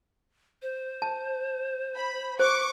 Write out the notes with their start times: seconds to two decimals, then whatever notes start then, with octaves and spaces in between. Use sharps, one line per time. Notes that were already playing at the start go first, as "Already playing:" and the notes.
0.62 C5
1.02 A5
1.95 B5
2.40 C5 C#6 D6